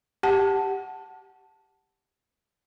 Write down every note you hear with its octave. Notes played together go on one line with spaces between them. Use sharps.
G4 F#5 A5